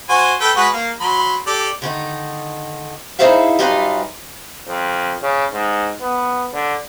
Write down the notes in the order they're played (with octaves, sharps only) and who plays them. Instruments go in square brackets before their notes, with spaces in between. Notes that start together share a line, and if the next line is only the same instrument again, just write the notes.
[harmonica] F#4 C5 G#5
A4 B4 G5
G#3 F#4 B4
A#3
F#3 B5 C6
G4 A4 D5
[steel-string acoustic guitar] D3 D#3 D#4
D#4 E4 G#4 C5 E5 F5
F#2 G3 D#4 F4 B4 F5
[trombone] F2
C#3
G#2
B3
D3